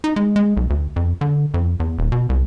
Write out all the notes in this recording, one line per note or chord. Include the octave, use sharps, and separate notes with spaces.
D#4
G#3
G#3
B1
D2
F2
D3
F2
E2
D#1
B2
C2